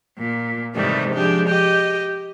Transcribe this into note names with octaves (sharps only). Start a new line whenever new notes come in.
A#2
G#2 C3 D#3 E3 G3 A3
F3 G#3 D4 G4
G4 D#5